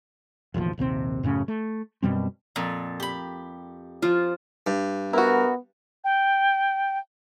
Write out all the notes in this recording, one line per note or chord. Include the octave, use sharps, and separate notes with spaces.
E1 A1 D#2 F3
A#1 D#2 C3 C4
F#2 A2 C#3 C#4
A3
F#2 B2 G3 C4
F2 A#2
G4 B5
F3 F4
G2
B3 E4 F#4 A#4
G5